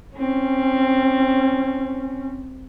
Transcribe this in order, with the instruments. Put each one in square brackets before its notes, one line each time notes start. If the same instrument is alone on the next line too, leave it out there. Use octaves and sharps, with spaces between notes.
[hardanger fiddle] C4 [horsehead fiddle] C#4